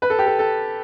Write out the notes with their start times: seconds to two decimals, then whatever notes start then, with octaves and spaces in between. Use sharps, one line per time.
0.02 B4
0.10 A4
0.18 G4
0.27 A4
0.39 A4